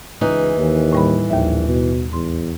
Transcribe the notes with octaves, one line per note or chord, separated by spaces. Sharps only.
C#2 E3 D#4 G#4
D#2
A2 G3 B5
A#1 D#2 E5
B2
E2 C6